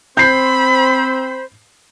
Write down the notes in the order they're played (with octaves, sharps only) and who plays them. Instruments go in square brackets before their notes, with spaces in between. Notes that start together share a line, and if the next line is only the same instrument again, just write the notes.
[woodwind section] C4 C5 [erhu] B5 [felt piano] G6 C7